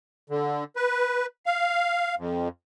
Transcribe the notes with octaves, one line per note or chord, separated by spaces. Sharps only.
D3
B4
F5
F2